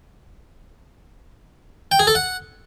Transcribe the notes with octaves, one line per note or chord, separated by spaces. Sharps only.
G5
G#4
A4
F#5